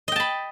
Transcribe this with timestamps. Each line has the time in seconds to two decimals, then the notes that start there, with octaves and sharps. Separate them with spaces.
0.08 D#5
0.12 G5
0.16 A5
0.20 B5